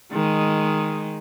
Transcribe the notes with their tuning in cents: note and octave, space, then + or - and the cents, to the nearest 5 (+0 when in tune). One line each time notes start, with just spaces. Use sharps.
D#3 +0 G#3 +0